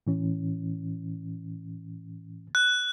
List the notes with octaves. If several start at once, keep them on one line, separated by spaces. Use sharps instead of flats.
A2 E3 C#4
F#6